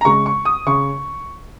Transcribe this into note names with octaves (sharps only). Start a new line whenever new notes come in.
A#5
C#3 G#3 C#6
C#6
D#6
C#3 C#6